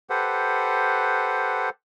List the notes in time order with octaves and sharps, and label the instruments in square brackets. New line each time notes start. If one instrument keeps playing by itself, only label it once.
[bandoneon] G4 A4 B4 C5 F#5